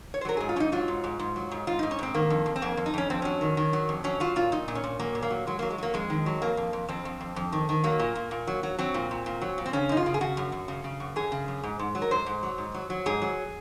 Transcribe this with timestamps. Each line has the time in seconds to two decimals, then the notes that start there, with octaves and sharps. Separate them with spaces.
0.14 C#5
0.21 C5
0.25 F#3 A#4
0.37 G#2 G#4
0.49 F4
0.56 G#2 C#4
0.60 D#4
0.72 F#3 F4
0.88 G#2
1.04 G#2
1.19 G#2
1.36 F#3
1.51 G#2
1.67 G#2 F4
1.79 G#2 D#4
1.91 C#4
1.99 G#2 C4
2.14 D#3 A#3
2.30 F2
2.46 F2
2.56 C4
2.62 F2 A#3
2.77 F2
2.86 D#4
2.94 F2 C#4
3.10 F2 C4
3.22 F#3 C#4
3.41 D#3
3.57 D#3
3.73 F#3
3.89 F2
4.04 F#3 C#4
4.20 F#3 F4
4.36 A#2 F4
4.52 A#2 D#4
4.68 A#2
4.75 C#4
4.84 A#2
4.99 F#3 A#3
5.15 A#2
5.22 A#3
5.30 F#3
5.47 F#3 G#3
5.59 F#3 A#3
5.70 G#3
5.78 F#3 A#3
5.94 F2 G#3
6.10 D#3
6.26 F#3
6.42 F2 A#3
6.57 F2
6.73 F2
6.89 F2 C4
7.05 F2
7.21 F2
7.36 F2
7.52 D#3
7.69 D#3
7.84 F#3 A#3
7.99 A#2
8.15 A#2
8.31 A#2
8.47 F#3
8.63 F#3
8.79 F#3 C4
8.94 A#2
9.11 A#2
9.26 A#2
9.41 F#3
9.58 A#2
9.66 C4
9.73 C#3 C#4
9.89 F#2 D#4
9.97 F4
10.06 C#3
10.14 G#4
10.21 C#3 F#4
10.37 F#2
10.52 F#2
10.68 C#3
10.84 C#3
11.00 F#2
11.16 F#2 G#4
11.32 C#3
11.48 F#2
11.63 G#2
11.79 G#2
11.95 F#3
12.02 A#4
12.11 G#2 C5
12.26 G#2
12.43 F#3
12.58 G#2
12.75 F#3
12.90 F#3
13.06 G#2 G#4
13.22 F#3